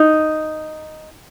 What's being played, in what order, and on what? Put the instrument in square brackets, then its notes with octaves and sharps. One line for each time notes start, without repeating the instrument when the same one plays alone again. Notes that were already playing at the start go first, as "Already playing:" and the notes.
Already playing: [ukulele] D#4